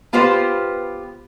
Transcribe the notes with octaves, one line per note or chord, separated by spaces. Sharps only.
B3 F4 G4 B4 C5